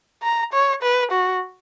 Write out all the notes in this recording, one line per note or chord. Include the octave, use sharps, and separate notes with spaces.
A#5
C#5
B4
F#4